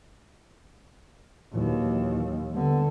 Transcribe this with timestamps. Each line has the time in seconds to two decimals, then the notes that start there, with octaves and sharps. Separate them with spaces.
1.54 D#2 A#2 E3 F#3
2.54 D3 G3 B3